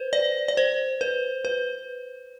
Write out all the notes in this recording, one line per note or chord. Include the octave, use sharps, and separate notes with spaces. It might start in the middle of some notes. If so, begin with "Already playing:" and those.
Already playing: B4 C5
D5
D5
C5
B4
B4